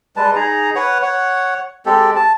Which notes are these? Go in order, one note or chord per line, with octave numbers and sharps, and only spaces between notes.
G3 G#3 B4 A5
D#4 G#4 A#5
B4 C#5 F#5
C#5 F#5
G#3 C4 G4 A4
A5